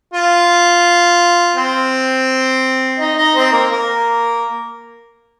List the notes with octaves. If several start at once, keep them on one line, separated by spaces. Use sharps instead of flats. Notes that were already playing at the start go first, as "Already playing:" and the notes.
F4
C4 C5
D#4 D#5
D#4 D#5
C4 C5
A#3 A#4
A#3 A#4